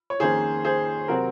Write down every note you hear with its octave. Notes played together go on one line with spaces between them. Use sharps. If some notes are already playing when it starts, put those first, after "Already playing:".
C#5
F2 D#3 A#3 C#4 G#4 C5
G#4 C5
C3 F#3 C4 F#4 A#4